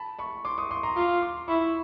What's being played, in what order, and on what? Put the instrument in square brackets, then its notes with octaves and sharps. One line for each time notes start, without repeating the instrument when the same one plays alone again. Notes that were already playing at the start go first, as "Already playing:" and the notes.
Already playing: [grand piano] A5 B5
B5 C#6
C6 D6
C#6 D#6
C6 D6
A#5 C6
[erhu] F4 [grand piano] C6 D6
[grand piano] C6 D6
[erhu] E4 [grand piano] B5 C#6